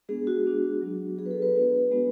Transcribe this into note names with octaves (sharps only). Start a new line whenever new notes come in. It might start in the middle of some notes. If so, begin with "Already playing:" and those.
G#3 B3 D4 G#4
F#4
G#3 B3 D4
F#3 B3 D4 F#4
F#3 B3 D4 F#4 G#4
B4
A4
B4
G#3 B3 D4 F#4
G#3 B3 D4 F#4